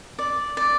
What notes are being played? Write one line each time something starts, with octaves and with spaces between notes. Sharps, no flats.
D5
D5